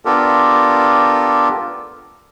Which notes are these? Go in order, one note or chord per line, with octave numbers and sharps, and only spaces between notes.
B3 D4 F4 G4 A4 A#4